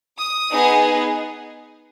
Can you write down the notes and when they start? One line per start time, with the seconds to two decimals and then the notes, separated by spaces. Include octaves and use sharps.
0.19 D#6
0.52 B3 D#4 G#4